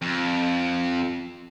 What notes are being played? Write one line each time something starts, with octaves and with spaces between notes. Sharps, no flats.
F2